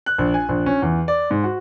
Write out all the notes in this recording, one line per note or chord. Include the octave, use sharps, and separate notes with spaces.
F#6
A#1
G#5
A#1
C#4
E2
D5
G#2
F#4